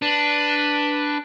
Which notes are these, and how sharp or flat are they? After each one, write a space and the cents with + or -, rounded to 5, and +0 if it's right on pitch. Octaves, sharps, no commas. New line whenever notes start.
D4 +0 B4 +0